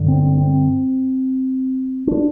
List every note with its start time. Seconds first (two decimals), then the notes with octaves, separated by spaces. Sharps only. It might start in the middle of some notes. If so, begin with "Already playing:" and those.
Already playing: G2 D3
0.08 C4
0.23 C4
0.38 C4
2.07 D4